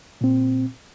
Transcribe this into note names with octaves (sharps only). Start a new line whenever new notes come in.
A#2 C4